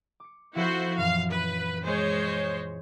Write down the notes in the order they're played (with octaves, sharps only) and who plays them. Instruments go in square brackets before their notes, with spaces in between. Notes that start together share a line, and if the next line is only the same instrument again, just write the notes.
[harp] D6 C#7
[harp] F3 C4 A4 [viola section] E4 F#4 C5
[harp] F#2 A#2 E3 [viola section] F5
[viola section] B4
G#3 C5 C#5